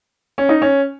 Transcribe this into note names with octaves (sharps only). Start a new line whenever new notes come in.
C#4
D#4
C#4